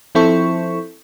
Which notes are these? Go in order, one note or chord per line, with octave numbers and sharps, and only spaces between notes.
F3 C4 E4 A4 C#6